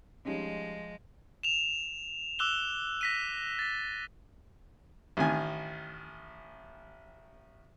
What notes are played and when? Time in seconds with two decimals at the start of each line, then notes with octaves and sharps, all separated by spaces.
0.25 F3 G3 G#3 C#4 D#4
1.43 E7 F7
2.39 D6 E6 F#6 E7 G7
3.01 A#6 B6 D#7
3.59 A6 B6
5.17 A1 D#3 G#5